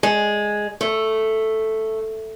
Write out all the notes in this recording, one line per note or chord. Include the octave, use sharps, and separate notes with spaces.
G#3
A3